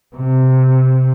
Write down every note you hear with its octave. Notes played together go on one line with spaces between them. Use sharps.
C3